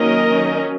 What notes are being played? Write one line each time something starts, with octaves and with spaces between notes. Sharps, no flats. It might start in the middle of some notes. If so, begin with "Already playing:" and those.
Already playing: D#3 F#3 A#3 C#4 A#4 D#5
D#3 F#3 C#4